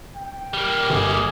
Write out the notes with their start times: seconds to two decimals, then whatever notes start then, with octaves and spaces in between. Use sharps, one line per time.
0.17 G5
0.54 G3 A#3
0.90 G1 G#4